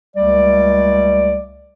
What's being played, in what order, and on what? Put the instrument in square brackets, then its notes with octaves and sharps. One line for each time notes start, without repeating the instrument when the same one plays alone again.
[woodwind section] C#2 G3 A3 D5